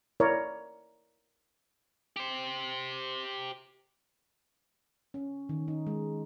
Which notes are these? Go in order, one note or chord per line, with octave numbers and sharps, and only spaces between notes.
E4 A#4 C#5 D5
G4 C5
C#4
D#3
D#4
G#3